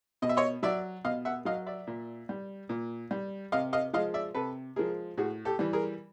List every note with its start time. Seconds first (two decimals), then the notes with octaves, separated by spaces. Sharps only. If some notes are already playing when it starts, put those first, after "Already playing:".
0.22 B2 D#5
0.29 E5
0.37 C#5 D#5
0.63 F#3 D5 E5
1.04 B2 D#5 F5
1.25 E5 F#5
1.45 F#3 D#5 F5
1.66 D5 E5
1.87 A#2
2.29 G3
2.69 A#2
3.11 G3
3.52 C3 D#5 F5
3.73 D#5 F5
3.93 F3 D#5 F5
3.97 G#3
4.14 D5 E5
4.35 C3 A4 B4
4.76 F3 G#3 G#4 A#4
5.17 A2 F#4 G#4
5.45 G4 A4
5.59 E3 G3
5.73 G#4 A#4